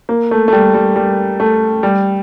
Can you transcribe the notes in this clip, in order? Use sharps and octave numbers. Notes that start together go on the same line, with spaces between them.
A#3
A3
A3
G3
G3
G3
A3
G3